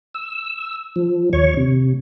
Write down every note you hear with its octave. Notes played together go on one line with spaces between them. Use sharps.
E6
F3
D#2 C#5 C#6
C3